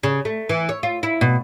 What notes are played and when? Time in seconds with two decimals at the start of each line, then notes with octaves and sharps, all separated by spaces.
0.03 C#3
0.25 A3
0.49 E3
0.69 C#5
0.83 F4
1.03 E4
1.21 B2